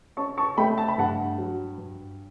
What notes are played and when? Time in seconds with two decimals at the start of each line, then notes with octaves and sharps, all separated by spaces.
0.17 C#4 A5 C#6
0.37 A5 C#6
0.57 A3 G5 B5
0.78 A5
0.88 B5
0.98 G2 F#5 A5
1.38 F#3
1.78 G2